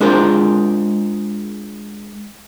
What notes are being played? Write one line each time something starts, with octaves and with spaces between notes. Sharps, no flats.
G#3 D4 F4 G#4 A#4 C5